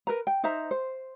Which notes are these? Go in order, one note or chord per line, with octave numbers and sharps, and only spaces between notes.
A#4 B4 A#5
G5
D#4 C5 E5 A#5
C5